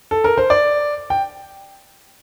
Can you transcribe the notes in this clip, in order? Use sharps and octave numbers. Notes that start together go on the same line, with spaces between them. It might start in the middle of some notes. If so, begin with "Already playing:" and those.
A4
A#4
C5
D5
G5